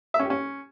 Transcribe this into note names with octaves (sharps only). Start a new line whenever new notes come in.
E5
C#4
G4
C#4